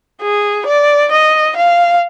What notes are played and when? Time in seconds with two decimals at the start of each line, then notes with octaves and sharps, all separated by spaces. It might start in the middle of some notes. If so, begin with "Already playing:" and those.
0.22 G#4
0.66 D5
1.11 D#5
1.56 F5